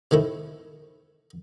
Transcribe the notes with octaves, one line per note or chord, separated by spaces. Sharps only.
C3 D#3 A3 E4